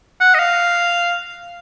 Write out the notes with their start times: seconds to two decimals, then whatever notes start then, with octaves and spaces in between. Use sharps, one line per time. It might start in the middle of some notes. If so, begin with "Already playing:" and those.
0.20 F#5
0.34 D#5
0.39 F5